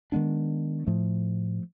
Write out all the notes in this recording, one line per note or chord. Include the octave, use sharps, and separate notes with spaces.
D#3 G#3 B3 D4
A2 F3 A3